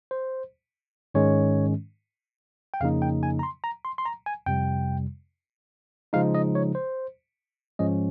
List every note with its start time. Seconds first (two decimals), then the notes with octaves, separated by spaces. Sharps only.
0.11 C5
1.14 G#2 D#3 G#3 C#4 C#5
2.74 G5
2.80 F2 C#3 F3 A#3 D#4 F5
3.02 G5
3.23 G#5
3.39 A#5
3.43 C6
3.64 A#5
3.85 C6
3.98 C6
4.06 A#5
4.26 G#5
4.46 F2 C3 G3 G5
6.13 C#3 F3 G#3 D#4 F5
6.35 D#5
6.55 C#5
6.75 C5
7.79 G#2 F3 G#3 C#4 D#5